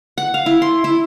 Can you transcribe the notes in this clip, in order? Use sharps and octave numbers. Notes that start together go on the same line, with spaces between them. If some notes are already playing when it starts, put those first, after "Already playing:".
F#5
F5
E4
C6
E4